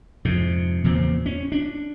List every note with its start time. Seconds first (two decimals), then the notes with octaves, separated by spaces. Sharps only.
0.25 F2 G#2 C3
0.84 E2 A#2 C#3 C4
1.26 C#4
1.52 D4